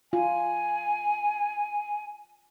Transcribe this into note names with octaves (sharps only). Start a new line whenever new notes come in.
F4 G#5